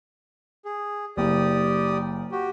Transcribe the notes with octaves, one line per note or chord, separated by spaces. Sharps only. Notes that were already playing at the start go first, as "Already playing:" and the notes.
G#4
F#1 G4 D5 D#6
F#4 G4